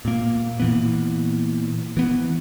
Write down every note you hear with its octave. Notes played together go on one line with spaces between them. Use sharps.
A#2 A#3
A#2 E3 B3
E3 B3